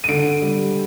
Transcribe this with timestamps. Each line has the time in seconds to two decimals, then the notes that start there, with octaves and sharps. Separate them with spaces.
0.04 D#7
0.08 D3 D7
0.42 G3